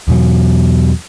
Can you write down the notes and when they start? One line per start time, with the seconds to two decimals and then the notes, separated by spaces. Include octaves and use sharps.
0.08 E2 B2 F#3